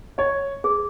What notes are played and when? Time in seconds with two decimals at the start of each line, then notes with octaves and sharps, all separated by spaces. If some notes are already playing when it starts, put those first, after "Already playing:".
0.18 C#5 D#5
0.64 G#4